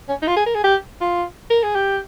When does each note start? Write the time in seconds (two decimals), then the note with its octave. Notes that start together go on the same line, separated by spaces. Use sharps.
0.09 C#4
0.22 D#4
0.28 F4
0.36 G#4
0.46 A#4
0.55 G#4
0.64 G4
1.01 F4
1.50 A#4
1.63 G#4
1.75 G4